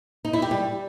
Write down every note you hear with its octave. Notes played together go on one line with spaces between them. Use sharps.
D#4
E4
G4
G3